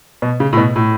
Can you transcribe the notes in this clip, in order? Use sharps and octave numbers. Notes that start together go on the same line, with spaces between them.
B2
C#3
A2
B2
A2